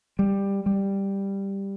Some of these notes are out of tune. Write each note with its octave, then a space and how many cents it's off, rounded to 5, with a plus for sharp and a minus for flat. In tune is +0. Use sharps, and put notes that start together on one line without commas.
G3 +10
G3 +5